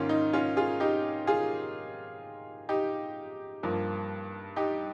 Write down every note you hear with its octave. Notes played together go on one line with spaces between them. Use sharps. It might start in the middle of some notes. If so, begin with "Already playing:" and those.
Already playing: G#2 D#3 A#3 C#4 F4
D#4
C#4 F4
F4 G#4
D#4 G4
F4 G#4
D#4 G4
G2 F3 A#3
D#4 G4